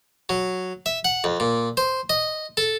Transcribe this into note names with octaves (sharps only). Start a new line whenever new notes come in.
F#3
E5
F#5
F2
A#2
C5
D#5
A4